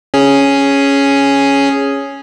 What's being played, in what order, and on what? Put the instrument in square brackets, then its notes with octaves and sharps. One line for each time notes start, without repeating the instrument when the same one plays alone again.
[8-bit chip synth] C#4 G#4